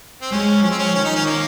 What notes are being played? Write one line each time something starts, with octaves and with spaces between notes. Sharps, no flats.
C4
G#3 C#4
F3 C#4
C4
C#4
D#3 C#4
D#4
C#4
A#3